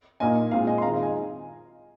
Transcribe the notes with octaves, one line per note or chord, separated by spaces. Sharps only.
A#2 A#3 D#4 D#5 G#5
A#2 G#3 C4 F4 F5
D#5 G#5
C6
D#3 G#3 C4 F4 F5 A#5
F5
D#5 G#5